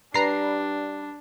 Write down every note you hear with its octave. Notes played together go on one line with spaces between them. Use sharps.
G3 D4 B4 A#5 C7